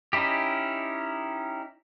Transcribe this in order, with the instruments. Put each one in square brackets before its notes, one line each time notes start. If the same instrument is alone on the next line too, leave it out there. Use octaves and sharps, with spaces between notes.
[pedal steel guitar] C#4 D#4 E4 G4